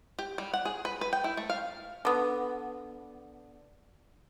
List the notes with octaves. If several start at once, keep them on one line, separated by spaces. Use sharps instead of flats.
G4
G3
F#5
G#4
B4
B4
G5
E4
A3
F5
D3 B3